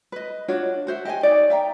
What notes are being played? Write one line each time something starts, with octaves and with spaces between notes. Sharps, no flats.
B4 D#5
D4 F4 F#4 C#5
F#4 C5 E5
G4 D#5 G5 G#5
D#4 C#5 D5
E5 G5 A#5